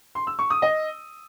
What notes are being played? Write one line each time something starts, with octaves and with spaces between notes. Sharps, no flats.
C6
E6
C#6
D#6
D#5